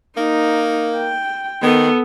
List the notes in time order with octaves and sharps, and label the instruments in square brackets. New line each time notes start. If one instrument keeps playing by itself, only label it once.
[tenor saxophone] A#3 [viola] D#4
[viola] G5
[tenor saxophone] D#3 [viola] B3 A4